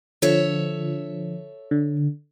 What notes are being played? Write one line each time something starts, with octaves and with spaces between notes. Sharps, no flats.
D3 F3 A4 C#5 E5
D3